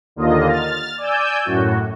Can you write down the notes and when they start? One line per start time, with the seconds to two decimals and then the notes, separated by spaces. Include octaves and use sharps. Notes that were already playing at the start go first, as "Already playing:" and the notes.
0.16 D#2 D3 A#3 F4 D#5
0.49 F6 A6
0.98 D5 G#5 E6 G6
1.45 F#2 A2 F#4